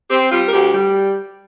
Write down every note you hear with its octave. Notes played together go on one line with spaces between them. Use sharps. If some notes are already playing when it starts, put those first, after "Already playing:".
C4 G4
G3 F4
A#4
D2 G4
G3